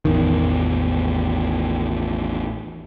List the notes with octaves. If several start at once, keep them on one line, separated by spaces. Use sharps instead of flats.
A1 E2 D#3